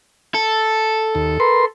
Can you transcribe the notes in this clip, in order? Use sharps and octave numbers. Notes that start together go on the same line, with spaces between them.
A4
D#2
A#4 B4 C6